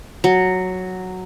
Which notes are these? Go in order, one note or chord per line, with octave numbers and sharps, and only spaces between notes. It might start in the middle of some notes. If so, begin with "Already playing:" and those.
F#3